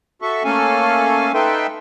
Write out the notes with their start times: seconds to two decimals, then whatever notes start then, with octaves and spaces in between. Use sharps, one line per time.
0.22 F#4 A4 E5 C#6
0.44 A3 A#3 C#4 A4 F5 G#5
1.34 D#4 A4 B4 E5 G5 C6